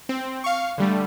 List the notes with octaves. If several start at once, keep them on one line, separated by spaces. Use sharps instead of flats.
C4
F5 C#6
D3 G3 A3